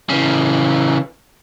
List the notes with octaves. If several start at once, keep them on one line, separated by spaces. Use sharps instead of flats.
C#3 E3